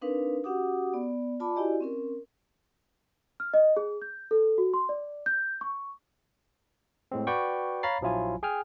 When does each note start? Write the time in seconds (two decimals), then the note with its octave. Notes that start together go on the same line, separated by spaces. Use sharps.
0.01 C4 D4 D#4 A#4 B4 F5
0.44 C#4 F#4 G4 F#5 D6 D#6
0.94 B3 D5
1.40 F4 D5 A5 B5 D6
1.56 E4 F#4 G4 D5 D#5 G#5
1.81 C4 C#4 A#4
3.40 F6
3.54 D#5
3.77 G#4
4.02 G6
4.31 A4
4.58 F#4
4.74 C6
4.89 D5
5.26 G6
5.61 C#6
7.12 A2 G#3 C4
7.27 F#4 B4 D5 G5 B5 C#6
7.83 C#5 F5 A#5 B5 A6 C7
8.01 A#1 F3 F#3 E4 F4 G#5
8.43 G#4 G5 G#5 F6